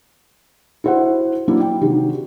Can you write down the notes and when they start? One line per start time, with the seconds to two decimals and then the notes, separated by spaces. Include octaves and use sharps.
0.84 E4 F#4 C5 E5 F#5
1.48 F#3 A#3 D4 E4
1.60 G5
1.81 C3 D#3 G#3 D4 F#4